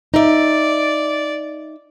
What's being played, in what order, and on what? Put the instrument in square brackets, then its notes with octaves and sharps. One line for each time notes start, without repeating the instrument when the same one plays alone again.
[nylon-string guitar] D#4 E5 [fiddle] D5